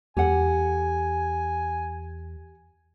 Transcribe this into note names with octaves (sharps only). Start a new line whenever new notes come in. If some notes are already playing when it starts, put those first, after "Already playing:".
E2 G4 A4 F#5 G#5